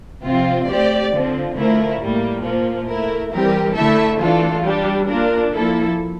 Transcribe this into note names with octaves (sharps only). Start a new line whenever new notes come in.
C3 F3 C4 F4
A3 C4 G4 D5
D3 F3 C4
D3 F3 A3 E4 A#4
A2 G3 A#3
A#2 F3 A#3
A3 E4 A#4
E3 G3 C4 G4 A#4
D3 A3 E4 A4 E5
E3 A3 D4 F4 A4
G3 D4 G4
A#3 D4 F4 A#4
F3 A#3 E4 A4